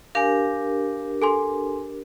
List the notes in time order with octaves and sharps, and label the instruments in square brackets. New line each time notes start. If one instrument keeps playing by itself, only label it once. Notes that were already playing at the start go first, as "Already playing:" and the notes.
[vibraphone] D4 G4 A#4 [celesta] F5 G#5
[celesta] A4 G#5 C6